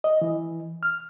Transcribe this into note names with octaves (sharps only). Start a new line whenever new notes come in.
D#5
E3
F6